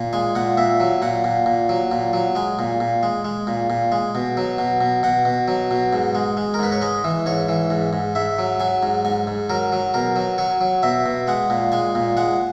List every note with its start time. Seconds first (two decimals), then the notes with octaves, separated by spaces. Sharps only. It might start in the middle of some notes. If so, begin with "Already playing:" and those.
Already playing: A#2
0.13 G#3 G#5
0.35 A#2 F#5
0.57 A#2 E5
0.80 F#3
1.02 A#2 F#5
1.24 A#2
1.46 A#2
1.69 F#3
1.92 A#2
2.13 F#3
2.35 G#3 G#5
2.59 A#2
2.80 A#2
3.03 G#3
3.25 G#3
3.47 A#2
3.70 A#2
3.92 G#3
4.15 B2
4.37 F#3
4.58 B2
4.81 B2
5.03 B2 F#5
5.25 B2
5.48 F#3
5.71 B2
5.93 G#2
6.15 G#3
6.37 G#3
6.54 A#4
6.59 G#2 B4
6.72 C#5
6.82 G#3 D#5
7.04 E3
7.26 G#2 C#5
7.49 E3
7.70 G#2
7.93 G#2
8.15 G#2 E5
8.39 F#3
8.60 F#3 G#5
8.83 G#2
9.05 G#2 G#5
9.27 G#2
9.50 F#3 A#4
9.72 F#3
9.94 B2 A#4
10.16 F#3
10.38 F#3 C#5
10.61 F#3
10.83 B2 E5
11.06 B2
11.27 G#3 F#5
11.50 A#2
11.72 G#3 G#5
11.95 A#2
12.17 G#3 F#5